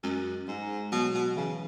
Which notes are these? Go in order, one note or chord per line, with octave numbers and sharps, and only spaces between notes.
F#2 G#3
G#2 G#3
B2 F#3
B2
C#3 E3